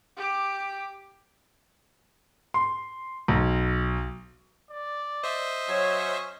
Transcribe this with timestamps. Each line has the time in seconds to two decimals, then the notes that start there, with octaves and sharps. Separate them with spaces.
0.17 G4 D6
2.54 C6
3.28 B1
4.70 D5
5.24 C5 D#5 E5
5.68 F#3 C#4 C#5